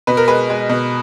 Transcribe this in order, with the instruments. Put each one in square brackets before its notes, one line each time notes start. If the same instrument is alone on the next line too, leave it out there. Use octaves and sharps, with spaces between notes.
[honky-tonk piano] B2 B4
A#4
G#3 B4
G#3
B2